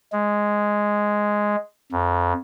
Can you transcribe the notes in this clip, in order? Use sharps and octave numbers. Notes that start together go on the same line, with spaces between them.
G#3
F2